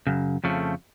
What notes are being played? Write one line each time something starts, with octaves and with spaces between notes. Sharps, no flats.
F#2 C#3
F2 C#3 F3 A3